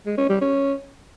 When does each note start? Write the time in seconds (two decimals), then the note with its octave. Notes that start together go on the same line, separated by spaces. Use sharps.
0.06 G#3
0.18 C#4
0.30 G3
0.41 C#4